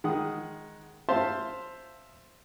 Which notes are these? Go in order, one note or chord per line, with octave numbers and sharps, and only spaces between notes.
D#3 G#3 F#5 D#6
C5 E5 F5 A5 C6